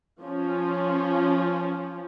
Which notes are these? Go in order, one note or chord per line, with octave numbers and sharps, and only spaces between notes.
F3 C#4